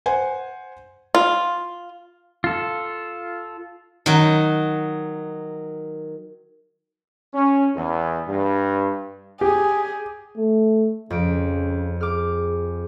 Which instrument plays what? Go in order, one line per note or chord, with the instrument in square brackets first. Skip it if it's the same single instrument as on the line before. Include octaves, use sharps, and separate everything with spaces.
[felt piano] C5 F#5 G#5
[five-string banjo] F4
[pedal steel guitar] F4 A4
[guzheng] D#3 F#3
[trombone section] C#4
E2
G2
[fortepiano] G4 [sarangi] G#4
[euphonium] A3
[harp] F2 D7 [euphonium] C#3
[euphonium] G#4 [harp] D6 F6